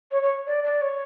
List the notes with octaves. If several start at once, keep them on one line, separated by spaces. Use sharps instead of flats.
C#5
C#5
D5
D5
C#5